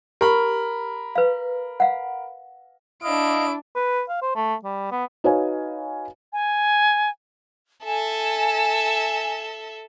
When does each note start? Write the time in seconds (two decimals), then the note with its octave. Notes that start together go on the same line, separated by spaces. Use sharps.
0.21 G4 A#4 B5
1.15 B4 F5
1.80 F5 F#5
3.03 D4 E4 D#5 F5 D7
3.75 B4
4.09 F5
4.22 C5
4.36 A3
4.65 G3
4.91 B3
5.24 D#4 F#4 B4 C#5 F5 G#5
6.33 G#5
7.84 A4 E5 G#5